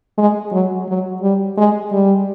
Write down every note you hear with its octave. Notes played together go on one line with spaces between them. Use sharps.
G#3
F#3
F#3
G3
G#3
G3